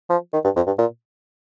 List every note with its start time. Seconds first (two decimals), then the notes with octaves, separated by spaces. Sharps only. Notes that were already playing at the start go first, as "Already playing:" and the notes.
0.10 F3
0.33 D#3
0.45 G2
0.56 F2
0.67 G2
0.78 A#2